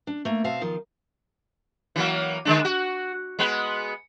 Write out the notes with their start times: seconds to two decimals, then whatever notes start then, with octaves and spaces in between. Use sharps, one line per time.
0.07 D4
0.25 A3 A#3
0.44 B2 C4 E5 F5 A5
0.61 D#3 F3 F4
1.96 E3 F#3 A#3
2.45 D3 G#3 D4
2.65 F#4
3.39 G#3 B3 B4